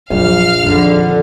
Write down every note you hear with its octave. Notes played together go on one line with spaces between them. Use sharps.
A#1 F2 F#3 F5 F6
F2 D3 D#3